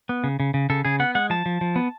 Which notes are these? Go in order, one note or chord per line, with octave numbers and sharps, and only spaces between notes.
B3
C#3
C#3
C#3
C#3 A4
C#3 G#4
B3 F#5
G#3 F#5
F3 A5
F3
F3
B3